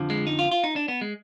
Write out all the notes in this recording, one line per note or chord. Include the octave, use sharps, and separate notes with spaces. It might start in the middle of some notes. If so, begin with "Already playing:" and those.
Already playing: F2 D3 F3
G#3
D#4
F4
F4
D#4
D4
B3
G#3